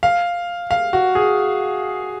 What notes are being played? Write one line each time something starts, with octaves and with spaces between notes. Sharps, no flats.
F5
F5
F#4
G#4